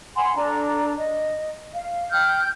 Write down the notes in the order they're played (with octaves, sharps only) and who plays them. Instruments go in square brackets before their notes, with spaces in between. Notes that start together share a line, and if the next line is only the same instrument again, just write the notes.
[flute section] F#5 G#5 B5 C6
D4 A4 A#5
D#5
F5
G5 F6 G6